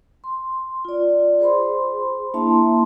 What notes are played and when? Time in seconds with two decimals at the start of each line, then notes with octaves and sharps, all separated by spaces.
0.24 C6
0.85 F4 D5
1.40 G#4 C5 B5 C6
2.34 A#3 D4 E4 E5 A5 C6